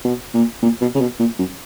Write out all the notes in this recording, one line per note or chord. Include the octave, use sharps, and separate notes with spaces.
B2
A#2
A#2
B2
C#3
B2
A#2
F#2